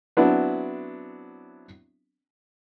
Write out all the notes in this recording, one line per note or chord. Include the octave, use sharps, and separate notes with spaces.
F#3 B3 C4 D4 E4